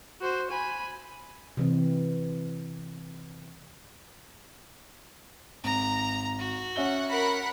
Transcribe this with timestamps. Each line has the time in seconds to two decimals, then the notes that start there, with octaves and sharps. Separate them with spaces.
0.21 F#4 C5
0.50 G#5 B5
1.57 C3 E3 C4
5.64 G#1 A#5
6.39 F#4
6.76 C#4 E5 F#5 G7
7.10 A#4 F#5 B5